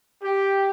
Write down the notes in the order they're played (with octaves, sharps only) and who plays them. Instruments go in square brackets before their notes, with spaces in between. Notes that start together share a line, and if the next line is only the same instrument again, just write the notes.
[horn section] G4